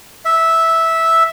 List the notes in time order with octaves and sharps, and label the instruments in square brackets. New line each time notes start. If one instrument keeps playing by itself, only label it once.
[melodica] E5